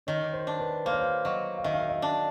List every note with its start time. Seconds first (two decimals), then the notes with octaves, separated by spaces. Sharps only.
0.07 D#3 C#5
0.33 C5
0.47 D4
0.60 B4
0.85 A#3 C5
0.93 C#5
1.01 C5
1.25 F#3 D#5
1.58 F5
1.64 D#3 E5
1.73 F5
1.81 E5
1.90 D#5
2.02 D4